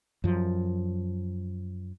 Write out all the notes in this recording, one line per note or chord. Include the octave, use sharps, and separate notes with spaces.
F#2 F3